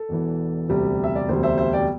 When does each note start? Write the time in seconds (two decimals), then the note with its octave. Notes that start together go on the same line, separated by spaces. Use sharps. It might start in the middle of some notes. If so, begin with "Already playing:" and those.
Already playing: A4
0.09 E1 E2 E3
0.69 E1 D2 C3 G3
1.04 E5
1.15 D5
1.28 E1 D2 C3 G3 C5
1.43 C5 E5
1.58 C5 E5
1.73 D5 G5